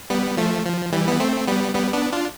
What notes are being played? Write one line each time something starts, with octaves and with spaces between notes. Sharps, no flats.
G3 B3
F3 A3
F3
E3 G3
B3
A3 C4
G3 B3
G3 B3
B3 D4
D4 F4